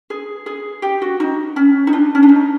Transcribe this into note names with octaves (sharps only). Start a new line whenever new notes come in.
G#4
G#4
G4
F#4
D#4
C#4
D#4
D4
C#4
D4
D#4